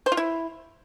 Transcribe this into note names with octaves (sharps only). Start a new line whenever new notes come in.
C5
F4
E4